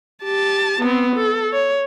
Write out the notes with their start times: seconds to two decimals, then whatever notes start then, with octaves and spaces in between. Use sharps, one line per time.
0.23 G4 A5
0.81 B3 C4
1.16 A4
1.53 C#5